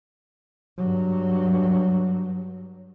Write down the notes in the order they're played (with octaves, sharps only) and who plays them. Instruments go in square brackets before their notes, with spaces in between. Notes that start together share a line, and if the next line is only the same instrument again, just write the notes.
[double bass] G2 F#3